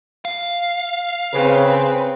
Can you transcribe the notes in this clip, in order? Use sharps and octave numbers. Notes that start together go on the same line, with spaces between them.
F5
C#3 C4 B4